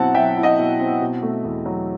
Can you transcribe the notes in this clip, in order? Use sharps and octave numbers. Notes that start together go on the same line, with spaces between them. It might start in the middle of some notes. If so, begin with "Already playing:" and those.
Already playing: B2 F#3 C4 E4 F#5 A5
F#3 E5 G5
E4
D#5 F#5
B2
C4
B2
A3
E2
F#3